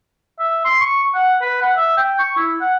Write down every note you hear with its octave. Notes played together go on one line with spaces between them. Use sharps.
E5
C6
C#6
F#5
B4
F#5
E5
G5
C#6
E4
F#5